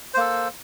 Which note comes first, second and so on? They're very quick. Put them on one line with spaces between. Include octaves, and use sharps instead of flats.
C5 A#3 A4